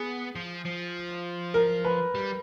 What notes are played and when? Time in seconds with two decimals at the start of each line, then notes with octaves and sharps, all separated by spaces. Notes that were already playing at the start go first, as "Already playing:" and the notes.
Already playing: B3 G#4
0.35 F3
0.65 F3
1.54 A#4
1.85 B4
2.15 G3